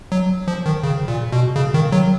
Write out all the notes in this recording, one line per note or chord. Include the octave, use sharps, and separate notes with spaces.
F#3
F3
D#3
C#3
A#2
B2
C#3
D#3
F#3